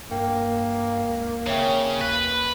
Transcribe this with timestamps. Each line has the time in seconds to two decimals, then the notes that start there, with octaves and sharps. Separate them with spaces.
0.11 G2 A#3 G5
1.08 C#2
1.47 G#1 C#3 C#5 E5 G5
2.01 D#2 B4 F#6